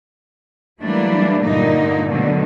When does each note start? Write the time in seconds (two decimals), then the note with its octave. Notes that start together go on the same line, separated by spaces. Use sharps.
0.81 E3 F#3 G3 A3 A#3 D4
1.42 G2 A#2 D3 A#3 D#4
2.09 B2 D3 D#3 F#3 G3 A3